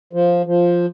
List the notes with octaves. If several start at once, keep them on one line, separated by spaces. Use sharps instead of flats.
F3
F3